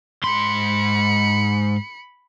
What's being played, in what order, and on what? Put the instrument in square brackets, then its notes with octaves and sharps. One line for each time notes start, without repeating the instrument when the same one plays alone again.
[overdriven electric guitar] G#2 C6 [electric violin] B5 C#7